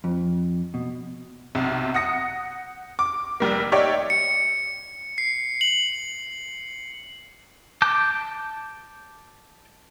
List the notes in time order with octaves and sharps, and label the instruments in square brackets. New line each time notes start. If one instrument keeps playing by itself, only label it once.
[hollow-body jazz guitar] F2
B2
[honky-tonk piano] B1 C3
F#5 D#6 A#6 C#7
D6
F1 G3 A#3
D#4 G4 C#5 D5 E5
[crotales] C#7
C7
F#7
[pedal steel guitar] A5 D6 G6